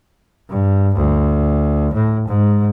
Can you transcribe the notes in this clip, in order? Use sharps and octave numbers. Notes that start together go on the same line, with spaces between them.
G2
D2
A2
G#2